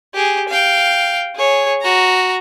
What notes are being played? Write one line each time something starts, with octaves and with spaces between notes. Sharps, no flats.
G4 G#4
F5 G5
G#4 C#5
F#4 A#5